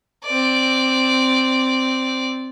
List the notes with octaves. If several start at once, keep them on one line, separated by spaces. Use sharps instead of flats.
C4 D5